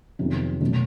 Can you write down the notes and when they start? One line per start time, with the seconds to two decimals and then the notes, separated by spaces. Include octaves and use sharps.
0.19 F2 C3 D#3 F#3 B3
0.61 B2 F#3 A3